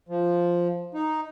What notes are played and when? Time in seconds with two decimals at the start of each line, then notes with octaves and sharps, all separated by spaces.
0.09 F3
0.95 D#4